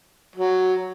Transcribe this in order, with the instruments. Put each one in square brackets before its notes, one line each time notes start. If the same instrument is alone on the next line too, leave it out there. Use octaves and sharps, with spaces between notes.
[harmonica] F#3